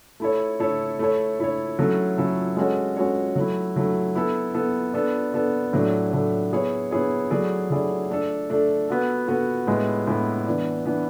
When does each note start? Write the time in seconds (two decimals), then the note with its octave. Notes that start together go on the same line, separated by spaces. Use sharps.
0.20 A3 E4 A4 C#5
0.60 A3 E4 A4 C#5
0.99 A3 E4 A4 C#5
1.39 A3 E4 A4 C#5
1.79 F#3 A3 C#4 E4 A4
2.17 F#3 A3 C#4 E4 A4
2.57 G#3 C#4 F#4 A4 C#5
2.97 G#3 C#4 F#4 A4 C#5
3.36 F#3 A3 E4
3.76 F#3 A3 E4
4.15 B3 E4 A4
4.54 B3 E4 A4
4.94 B3 D4 A4
5.34 B3 D4 A4
5.73 A2 F#3 A3 D4
6.13 A2 F#3 A3 D4
6.51 B3 E4 G#4 C#5
6.91 B3 E4 G#4 C#5
7.31 F#3 A3 E4 G#4 D5
7.70 F#3 A3 E4 G#4 D5
8.10 A3 D4 A4
8.50 A3 D4 A4
8.89 B3 F#4 A4
9.28 B3 F#4 A4
9.67 A2 G#3 B3
10.07 A2 G#3 B3
10.47 E3 B3 D4
10.86 E3 B3 D4